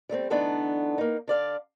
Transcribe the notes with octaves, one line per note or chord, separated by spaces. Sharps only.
G3 A3 A#3 C4
D3 E3 A3 B3 D4 D#4
A#3 D#4
D3 D5 F5